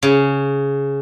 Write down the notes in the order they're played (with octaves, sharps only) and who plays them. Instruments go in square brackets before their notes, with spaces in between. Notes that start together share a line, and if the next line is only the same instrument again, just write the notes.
[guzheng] C#3